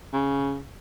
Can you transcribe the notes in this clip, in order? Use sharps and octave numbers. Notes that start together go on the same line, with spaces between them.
C#3